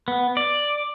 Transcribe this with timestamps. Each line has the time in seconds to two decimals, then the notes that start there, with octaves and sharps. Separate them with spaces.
0.08 B3
0.37 D5